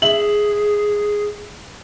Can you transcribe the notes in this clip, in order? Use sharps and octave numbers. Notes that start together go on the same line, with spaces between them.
G#4 E5 F#7